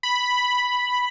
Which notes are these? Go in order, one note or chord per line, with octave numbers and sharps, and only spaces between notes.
B5